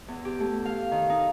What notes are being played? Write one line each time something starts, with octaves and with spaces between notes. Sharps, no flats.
E2
G4
A3
F5
D#3
D#4